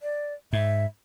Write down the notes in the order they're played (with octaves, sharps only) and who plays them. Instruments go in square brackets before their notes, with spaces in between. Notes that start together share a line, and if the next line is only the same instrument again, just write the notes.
[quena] D5
[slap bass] G#2 [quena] E5